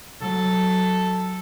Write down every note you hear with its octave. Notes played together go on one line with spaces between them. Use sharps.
F#3 A4